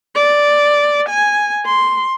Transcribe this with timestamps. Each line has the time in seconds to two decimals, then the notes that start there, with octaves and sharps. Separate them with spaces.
0.15 D5
1.09 G#5
1.65 C6